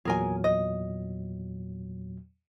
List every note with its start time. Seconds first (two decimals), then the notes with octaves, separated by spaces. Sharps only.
0.05 E2 A#2 F#3 G#4 A#4 G#5
0.44 D#5